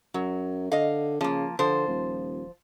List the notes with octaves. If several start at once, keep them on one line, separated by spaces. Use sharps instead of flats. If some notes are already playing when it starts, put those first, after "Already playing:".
F#2 F#3
D3 D#5 F5
C#3 F3 A#3
D3 F3 C5
D#1